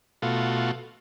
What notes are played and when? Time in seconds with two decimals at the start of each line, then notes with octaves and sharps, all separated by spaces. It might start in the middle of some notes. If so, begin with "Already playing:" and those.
0.22 B2 A3 F4 F#4